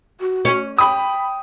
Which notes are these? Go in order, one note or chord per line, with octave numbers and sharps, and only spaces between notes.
F#4
C#4
G5 B5 D#6